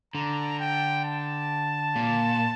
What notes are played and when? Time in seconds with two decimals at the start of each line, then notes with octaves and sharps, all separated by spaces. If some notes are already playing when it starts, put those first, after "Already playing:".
0.14 D3 A#5
0.60 G5
1.05 A5
1.95 A#2